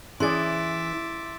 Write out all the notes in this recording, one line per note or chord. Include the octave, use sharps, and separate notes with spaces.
E3 C#4 G#4 D5 E5 C6 D6 A6